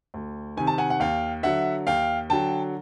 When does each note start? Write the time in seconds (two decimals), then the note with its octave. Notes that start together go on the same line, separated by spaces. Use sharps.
0.14 D2
0.57 C3 D#3 G#5
0.67 A5
0.78 F#5 G#5
0.90 F#5
1.00 D#2 F5 G5
1.43 D3 F#3 E5 F#5
1.87 D#2 F5 G5
2.30 D3 F#3 G5 A5